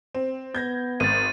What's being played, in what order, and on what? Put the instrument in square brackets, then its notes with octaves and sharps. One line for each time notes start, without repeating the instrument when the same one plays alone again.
[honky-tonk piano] C4
[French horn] B3 [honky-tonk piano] G6 G#6 A#6
[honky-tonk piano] G#1 [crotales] A6 D#7